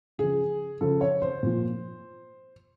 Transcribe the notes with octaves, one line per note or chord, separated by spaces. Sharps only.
C#3 F3 G#4
C#3 F3 A4
C#5
C5
A#2 F3